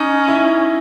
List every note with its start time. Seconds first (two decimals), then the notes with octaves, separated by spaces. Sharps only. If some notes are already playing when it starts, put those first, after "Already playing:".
Already playing: C#4 D#4
0.28 E4